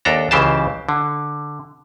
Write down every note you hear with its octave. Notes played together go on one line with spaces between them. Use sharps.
D#2 D4 A4 A#5
C#2 C#3 E3 G4 C5 A5
D3